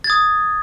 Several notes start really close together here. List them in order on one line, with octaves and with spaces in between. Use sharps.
A6 G#6 D#6